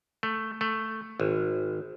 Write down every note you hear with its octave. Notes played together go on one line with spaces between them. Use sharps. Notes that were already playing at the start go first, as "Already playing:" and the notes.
A3
A3
G#1